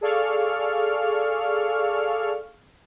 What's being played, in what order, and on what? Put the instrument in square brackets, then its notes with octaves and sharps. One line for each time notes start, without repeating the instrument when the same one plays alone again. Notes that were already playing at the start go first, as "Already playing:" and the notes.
[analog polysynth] G#4 A4 D5 F5 C#6 F6